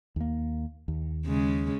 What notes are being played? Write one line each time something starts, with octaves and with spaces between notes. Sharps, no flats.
D#2 A#3
D#2
C#3 G#3 C#4